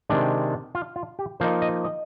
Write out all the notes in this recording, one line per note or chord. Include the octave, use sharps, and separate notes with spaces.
C3 D#3 G#3 D4
F4
F4
G4
F3 A#3 D#4 C5
D#5
D#5